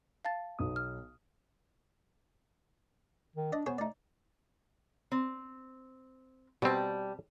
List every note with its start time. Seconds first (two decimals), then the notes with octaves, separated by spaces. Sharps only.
0.25 F5 A5 A6
0.59 B1 B2 D#6
0.76 F6
3.36 D#3
3.52 D4 D5 D#5
3.66 B3 G#4 C5 C#5
3.78 A3 D#4 D5
5.12 C4
6.62 B2 G3 C4 A5